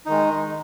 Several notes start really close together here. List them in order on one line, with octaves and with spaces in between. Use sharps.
D#4 D#3 G#3